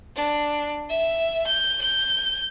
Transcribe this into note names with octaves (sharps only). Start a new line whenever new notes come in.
D4
E5
G6
G6